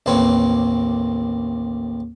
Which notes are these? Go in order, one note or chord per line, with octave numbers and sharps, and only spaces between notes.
A1 D#2 A#3 C4 B4 C#5